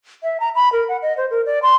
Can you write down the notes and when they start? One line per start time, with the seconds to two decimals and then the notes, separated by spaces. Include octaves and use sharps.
0.23 E5
0.40 A#5
0.55 B5
0.72 A#4
0.88 F#5
1.02 D#5
1.17 C5
1.31 A#4
1.46 D5
1.63 C6